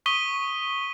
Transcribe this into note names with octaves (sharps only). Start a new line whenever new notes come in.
C#6 D#6 B6 D#7 G7